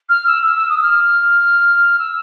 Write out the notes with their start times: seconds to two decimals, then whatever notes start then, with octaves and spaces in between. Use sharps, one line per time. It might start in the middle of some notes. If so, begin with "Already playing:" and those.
0.09 F6
0.27 E6
0.43 E6
0.57 E6
0.69 D#6
0.77 E6
0.83 F6
1.99 E6